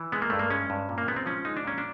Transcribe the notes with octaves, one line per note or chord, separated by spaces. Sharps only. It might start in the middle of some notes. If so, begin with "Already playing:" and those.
Already playing: E3
G#3 B3
A#3
G2 A3
A#3
G#3 C#4
G2
A#2
A#3
G#3 B3
C4
F3 C#4
G#3 D#4
D4
A#2 C#4
D4